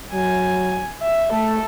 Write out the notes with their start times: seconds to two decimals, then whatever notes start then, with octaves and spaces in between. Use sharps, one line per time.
0.13 F#3 G#5
1.01 E5
1.32 A3 A4